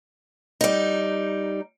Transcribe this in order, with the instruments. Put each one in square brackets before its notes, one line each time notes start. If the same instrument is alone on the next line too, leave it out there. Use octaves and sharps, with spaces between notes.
[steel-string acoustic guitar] G3 D#4